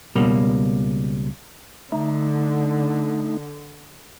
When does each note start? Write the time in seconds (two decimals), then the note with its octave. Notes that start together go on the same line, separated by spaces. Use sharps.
0.15 C#2 B2 G3 A#3
1.92 D3 A3 D#4